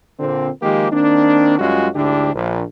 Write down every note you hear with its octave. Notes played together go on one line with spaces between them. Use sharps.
A#2 D3 C4
D#3 F3 G#3 A#3 G4
D#3 A#3 C4 D4
F#2 G3 G#3 C#4 F4 F#4
D2 G#2 D3 D4 E4 G4
A#1